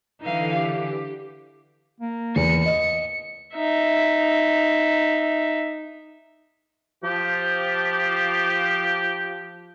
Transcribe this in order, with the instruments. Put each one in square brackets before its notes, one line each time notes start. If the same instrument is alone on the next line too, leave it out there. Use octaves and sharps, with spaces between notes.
[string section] D3 E3 [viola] D#4 F5
[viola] G4
[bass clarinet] A#3
[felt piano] E2 [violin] C#7
[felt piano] D#5
[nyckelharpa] D#4 E5
[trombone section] F3 [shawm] G4